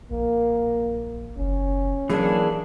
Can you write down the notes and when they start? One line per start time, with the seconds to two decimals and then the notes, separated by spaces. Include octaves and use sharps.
0.11 A#1 A#3
1.37 F#1 C#4
2.10 E3 F#3 A#3 D4 G#4